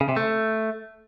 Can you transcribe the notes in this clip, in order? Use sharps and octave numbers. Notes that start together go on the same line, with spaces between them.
C#3
C3
A3